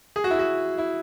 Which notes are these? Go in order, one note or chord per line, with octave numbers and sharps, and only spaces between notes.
G#4
F#4
E4
F#4
E4